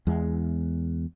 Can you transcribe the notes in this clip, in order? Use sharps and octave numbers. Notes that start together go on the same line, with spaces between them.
E2 G#3